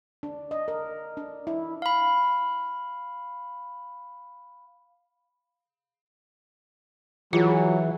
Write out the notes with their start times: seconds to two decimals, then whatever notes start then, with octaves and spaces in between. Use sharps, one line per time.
0.23 D4
0.51 D#5
0.68 A#4
1.17 D4
1.47 E4
1.82 F5 B5
7.33 E3 F#3 F4 G#4